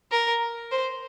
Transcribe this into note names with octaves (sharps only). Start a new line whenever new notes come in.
A#4
C5